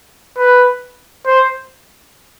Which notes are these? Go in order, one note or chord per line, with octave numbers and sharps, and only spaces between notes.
B4
C5